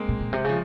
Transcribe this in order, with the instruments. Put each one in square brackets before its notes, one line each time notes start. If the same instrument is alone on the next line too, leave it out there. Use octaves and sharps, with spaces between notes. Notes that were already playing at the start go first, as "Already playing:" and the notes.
Already playing: [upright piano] G#3 A#3 C4
[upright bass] A#2
A#2
C3
[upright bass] C#3 [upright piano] F3